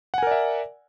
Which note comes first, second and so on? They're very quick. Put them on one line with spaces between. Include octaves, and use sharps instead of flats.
F#5 G#5 A#4 D5 E5